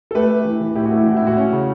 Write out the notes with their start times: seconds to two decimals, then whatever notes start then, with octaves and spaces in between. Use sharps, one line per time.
0.11 A4
0.15 A3 G4 B4
0.30 A3
0.45 E3
0.61 E3
0.75 A2 E4 G4
0.86 F#4
0.91 A3
0.97 E4
1.06 E3 F#4
1.17 E4
1.22 A2 F#4
1.37 C#4
1.53 C#3